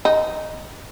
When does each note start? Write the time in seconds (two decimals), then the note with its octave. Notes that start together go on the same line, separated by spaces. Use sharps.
0.05 D#4